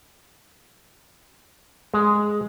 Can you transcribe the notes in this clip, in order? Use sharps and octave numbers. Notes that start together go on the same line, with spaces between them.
G#3